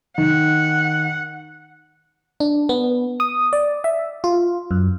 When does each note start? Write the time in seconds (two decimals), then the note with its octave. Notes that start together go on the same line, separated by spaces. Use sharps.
0.18 D#3 F#5
2.40 D4
2.69 B3
3.20 D#6
3.53 D5
3.84 E5
4.24 F4
4.71 F#2